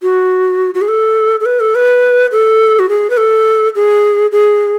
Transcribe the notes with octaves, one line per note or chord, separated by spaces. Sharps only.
F#4
F#4
G#4
A4
A4
B4
A4
B4
A4
F#4
G#4
B4
A4
G#4
G#4